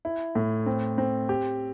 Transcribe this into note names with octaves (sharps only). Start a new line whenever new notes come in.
E4
A2
C4
C4
G4